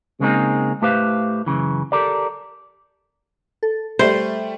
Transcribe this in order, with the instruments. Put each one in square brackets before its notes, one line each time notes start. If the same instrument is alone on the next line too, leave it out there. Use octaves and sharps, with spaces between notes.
[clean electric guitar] C#3 G#3 A#3 C4 D#4 G#4
A2 A3 G4 B4 C5 F5
F#2 A2 C#3 E3
G4 A4 A#4 D5
[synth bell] A4
[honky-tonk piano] G3 A3 [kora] C5